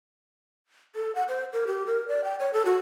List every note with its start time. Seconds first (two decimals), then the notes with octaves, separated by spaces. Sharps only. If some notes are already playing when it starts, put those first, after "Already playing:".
0.95 A4
1.15 F#5
1.29 C5
1.53 A#4
1.67 G4
1.87 A#4
2.08 D5
2.24 G5
2.40 C#5
2.53 A4
2.65 F#4